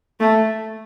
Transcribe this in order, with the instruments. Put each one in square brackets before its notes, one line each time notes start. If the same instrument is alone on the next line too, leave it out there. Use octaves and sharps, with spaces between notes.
[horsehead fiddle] A3